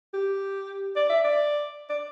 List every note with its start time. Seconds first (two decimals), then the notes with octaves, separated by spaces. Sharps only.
0.14 G4
0.96 D5
1.10 E5
1.24 D5
1.89 D5